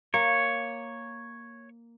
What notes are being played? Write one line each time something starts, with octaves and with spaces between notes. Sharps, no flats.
A#3 C#5